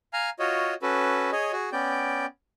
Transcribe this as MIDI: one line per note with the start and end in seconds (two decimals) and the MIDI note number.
0.13 0.30 77
0.13 0.30 80
0.13 0.30 82
0.13 0.30 89
0.39 0.74 65
0.39 0.74 66
0.39 0.74 73
0.39 0.74 75
0.82 1.31 61
0.82 1.31 66
0.82 1.31 69
0.82 1.31 71
1.32 1.52 68
1.32 1.52 73
1.32 1.52 75
1.52 1.70 66
1.52 1.70 68
1.72 2.26 59
1.72 2.26 61
1.72 2.26 74
1.72 2.26 79